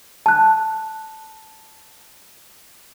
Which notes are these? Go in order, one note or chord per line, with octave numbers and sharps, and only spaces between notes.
A5 F#6